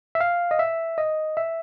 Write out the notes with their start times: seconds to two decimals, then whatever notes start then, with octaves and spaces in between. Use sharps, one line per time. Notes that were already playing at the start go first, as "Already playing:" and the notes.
0.15 E5
0.21 F5
0.51 D#5
0.59 E5
0.98 D#5
1.37 E5